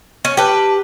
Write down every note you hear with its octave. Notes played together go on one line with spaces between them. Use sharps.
C#4
G4 B4 A5